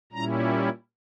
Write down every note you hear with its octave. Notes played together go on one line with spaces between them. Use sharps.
A#2 G3 C#4 E4 A#5